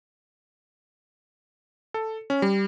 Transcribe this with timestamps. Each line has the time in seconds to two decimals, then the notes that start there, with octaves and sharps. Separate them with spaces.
1.94 A4
2.30 C#4
2.42 G3